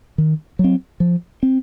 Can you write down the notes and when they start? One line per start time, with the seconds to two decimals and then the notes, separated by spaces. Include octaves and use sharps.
0.18 D#3
0.59 F#3
0.64 C4
1.00 F3
1.43 C4